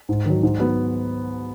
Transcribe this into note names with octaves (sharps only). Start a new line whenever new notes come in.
G#2
D#3 F#3
G#2
F#3 B3